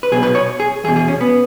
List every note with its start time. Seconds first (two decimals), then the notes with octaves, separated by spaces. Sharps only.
0.03 B4
0.12 B1 B2 G#4
0.23 B4
0.35 C#5
0.60 G#4
0.84 E2 G#4
0.88 B2
0.96 G#4
1.08 C#4
1.21 B3